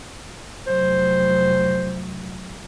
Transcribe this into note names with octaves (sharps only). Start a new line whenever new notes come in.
F1 F#3 C5